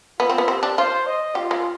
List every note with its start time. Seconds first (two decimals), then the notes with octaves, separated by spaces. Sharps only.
0.20 B3 F4
0.30 C4
0.38 B3
0.48 C4 G4
0.63 D4
0.77 F4 C5
1.06 D#5
1.35 F4 G4
1.51 G#3